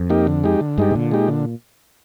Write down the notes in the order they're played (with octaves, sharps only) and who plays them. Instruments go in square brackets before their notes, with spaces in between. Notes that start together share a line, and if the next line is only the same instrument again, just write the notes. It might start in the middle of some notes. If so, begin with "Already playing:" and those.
Already playing: [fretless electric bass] F2
[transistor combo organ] A#3 D#4 G4
D3
G#3 D#4 G4
D3
[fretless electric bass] G2 [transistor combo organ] G#3 D#4 G4
[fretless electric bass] C3
[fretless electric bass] A#2 [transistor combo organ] D3
[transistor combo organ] G#3 D#4 G4
D3